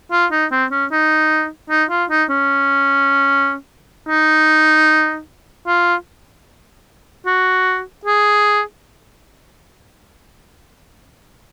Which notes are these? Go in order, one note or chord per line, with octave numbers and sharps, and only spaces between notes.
F4
D#4
C4
C#4
D#4
D#4
F4
D#4
C#4
D#4
F4
F#4
G#4